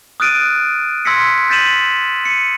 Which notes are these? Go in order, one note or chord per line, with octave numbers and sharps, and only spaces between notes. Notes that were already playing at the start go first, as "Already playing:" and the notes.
D#6 F6 F#6 A6 D7 D#7
C6 E6 G#6 A#6 B6 C#7
G6 A6 B6 D#7 E7 F#7
C#7 D#7